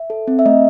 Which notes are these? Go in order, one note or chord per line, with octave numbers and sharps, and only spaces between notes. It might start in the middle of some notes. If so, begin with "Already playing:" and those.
Already playing: E5
A4
C4
E5
A3 D#5